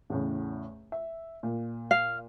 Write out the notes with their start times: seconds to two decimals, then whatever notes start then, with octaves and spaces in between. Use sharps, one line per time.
0.10 E2 A2 C#3
0.92 E5
1.43 A#2
1.91 F5